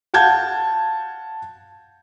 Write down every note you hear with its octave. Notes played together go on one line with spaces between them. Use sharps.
F5 F#5 A5 G6 G#6